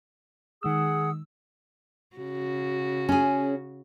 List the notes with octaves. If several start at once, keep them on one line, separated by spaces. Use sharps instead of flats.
D#3 G#3 G#4 F#5 D#6 E6
C#3 F#4
C#4 G#4